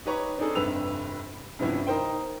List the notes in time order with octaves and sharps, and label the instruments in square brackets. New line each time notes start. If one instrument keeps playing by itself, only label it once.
[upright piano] D#4 G4 B4 C#5 A#5 C#6
C4 D4 D#4 G#4 A4
F1 G2 C3 B4 E6 F7
G2 C3 F3 B3 C#4 E4
D#4 A#4 C5 G5